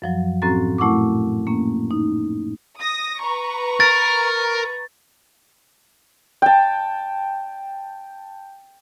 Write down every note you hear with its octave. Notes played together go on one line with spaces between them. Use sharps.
F#2 F3 F#3
A2 C4 C#4 F#4 A#5 A6
A#2 A3 E4 F#5 C#6 D6
A#3 C#4
D#4
D#6 A#6
B4 A#5 C#6
A#4 A6
G5 A5